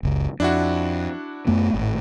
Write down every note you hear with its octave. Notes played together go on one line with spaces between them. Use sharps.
F#1 C#2
F2 D4 E4 F#4
F#2 A3 B3
G#1 A2